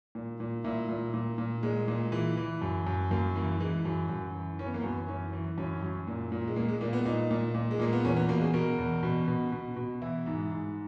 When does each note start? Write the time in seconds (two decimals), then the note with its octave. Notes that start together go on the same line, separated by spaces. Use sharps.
0.15 A#2
0.40 A#2
0.64 A#2 E4
0.89 A#2
1.14 A#2
1.38 A#2
1.63 A#2 G#3
1.88 A#2
2.12 E3
2.37 E3
2.62 F#2
2.87 F#2
3.11 F#2 A#3
3.35 E3 A#3
3.60 E3 G#3
3.85 F#2
4.10 F#2
4.34 E3
4.59 E3 C#4
4.66 B3
4.74 A#3
4.82 F#2 B3
5.08 E3 C#4
5.33 E3
5.58 F#2 C#4
5.82 F#2
6.07 A#2
6.32 A#2
6.48 G#3
6.56 A#2 A#3
6.68 G#3
6.81 A#2 A#3
6.93 B3
7.05 A#2 D#4
7.31 A#2
7.55 A#2
7.71 G#3
7.80 A#2 A#3
7.93 B3
8.04 E2 C#4
8.17 B3
8.29 B2 A#3
8.41 G#4
8.54 B2 A#4
8.78 E2
9.03 B2
9.28 B2
9.52 B2
9.76 B2
10.02 E3 E4
10.26 G#2
10.51 G#2